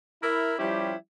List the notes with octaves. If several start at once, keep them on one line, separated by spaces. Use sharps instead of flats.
E4 A#4
F3 G3 C#4 E4 G4